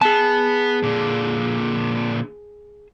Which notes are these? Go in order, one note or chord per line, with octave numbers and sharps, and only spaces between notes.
B3 G#4 A5
A#2 D3